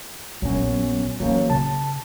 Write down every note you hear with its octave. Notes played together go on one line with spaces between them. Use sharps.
A#1 F#3 B3 C#4
E3 F#3 A#3 C#4
C#3 A5